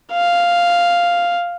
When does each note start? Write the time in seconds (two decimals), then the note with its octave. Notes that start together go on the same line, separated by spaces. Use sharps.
0.13 F5